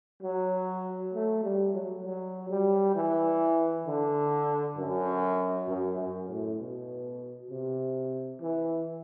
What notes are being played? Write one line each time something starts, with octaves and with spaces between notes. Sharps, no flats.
F#3
A3
G3
F#3
F#3
G3
E3
D3
F#2
F#2
F#2
A2
B2
C3
E3